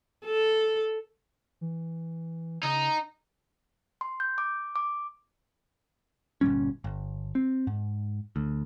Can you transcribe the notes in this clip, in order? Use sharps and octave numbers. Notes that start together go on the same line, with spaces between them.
A4
E3
C#3 D#4
C6
G6
D6
D6
G1 A#2 G3 C#4
G1
C4
G#2
D2